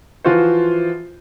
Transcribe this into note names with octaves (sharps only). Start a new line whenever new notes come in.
E3 F3 F4 F#4 C5